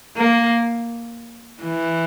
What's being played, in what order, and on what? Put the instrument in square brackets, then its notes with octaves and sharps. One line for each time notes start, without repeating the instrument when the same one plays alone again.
[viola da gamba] A#3
E3